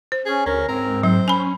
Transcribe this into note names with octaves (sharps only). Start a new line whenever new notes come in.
C5
C#4 G#4
D2 C#4 A#4
G#2 C4 A#4
F#3 C5
C#4 G#5 B5